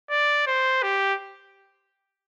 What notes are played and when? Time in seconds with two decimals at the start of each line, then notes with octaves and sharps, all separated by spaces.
0.10 D5
0.47 C5
0.83 G4